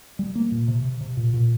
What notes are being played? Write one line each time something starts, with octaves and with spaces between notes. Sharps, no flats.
G3
A#3
A#2
C3
C3
C3
A#2
A#2